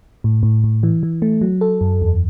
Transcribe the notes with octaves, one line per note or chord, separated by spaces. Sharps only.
A2
A2
A2
E3
E3
A3
F#3
A4
F#2
E2